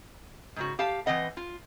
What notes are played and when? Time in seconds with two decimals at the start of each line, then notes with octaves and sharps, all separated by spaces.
0.56 G#2 C#3 F#4
0.79 G4 F5 A5
1.06 E3 C4 B4 D#5 F#5
1.37 F4